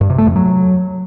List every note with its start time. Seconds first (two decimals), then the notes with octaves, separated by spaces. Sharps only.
0.01 G2
0.10 C3
0.18 A3
0.27 F2
0.36 F#3